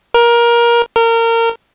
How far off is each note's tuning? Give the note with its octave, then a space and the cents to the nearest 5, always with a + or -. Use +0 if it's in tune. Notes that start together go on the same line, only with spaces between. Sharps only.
A#4 +20
A#4 -25